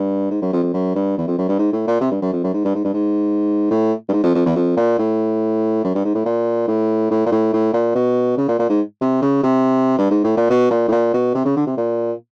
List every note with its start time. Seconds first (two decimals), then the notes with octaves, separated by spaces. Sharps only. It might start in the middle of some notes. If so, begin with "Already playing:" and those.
Already playing: G2
0.31 G#2
0.42 F#2
0.53 F2
0.63 F2
0.73 F#2
0.95 G2
1.17 E2
1.28 F2
1.38 F#2
1.49 G2
1.59 G#2
1.72 A2
1.87 A#2
2.01 C3
2.11 G2
2.22 F#2
2.33 F2
2.43 F#2
2.54 G#2
2.65 G2
2.75 G#2
2.84 G2
2.94 G#2
3.71 A2
4.09 G2
4.13 G#2
4.23 F2
4.35 F2
4.45 E2
4.56 F2
4.77 A#2
4.99 A2
5.84 F#2
5.95 G2
6.05 G#2
6.15 A2
6.25 A#2
6.68 A2
7.11 A2
7.26 A#2
7.31 A2
7.53 A2
7.73 A#2
7.95 B2
8.37 C#3
8.48 A#2
8.59 A#2
8.69 G#2
9.01 C3
9.22 C#3
9.43 C3
9.98 G2
10.11 G#2
10.24 A2
10.37 A#2
10.50 B2
10.70 A#2
10.88 A2
10.92 A#2
11.14 B2
11.35 C3
11.45 C#3
11.56 D3
11.67 C3
11.77 A#2